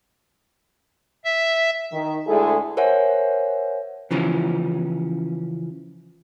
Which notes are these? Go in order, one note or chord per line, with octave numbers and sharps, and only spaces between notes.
E5
D#3
D2 G#3 E4 G#4 A4
A#4 C5 C#5 E5 F#5 G#5
C#3 E3 F3 C#4